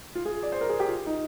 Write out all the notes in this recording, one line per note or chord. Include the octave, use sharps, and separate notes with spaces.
F4
G#4
D5
C5
A#4
G#4
G4
F4
D#4